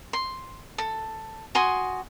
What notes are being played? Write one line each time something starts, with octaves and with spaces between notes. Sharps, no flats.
C6
A4
F#4 G#5 C6 D#6